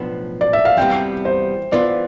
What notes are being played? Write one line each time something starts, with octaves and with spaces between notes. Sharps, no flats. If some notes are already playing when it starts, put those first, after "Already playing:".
Already playing: B1 A2 F3 B3 D4
D5
E5
F5
E2 C3 E3 G3 B3 G5
C5
E3 B3 F4 D5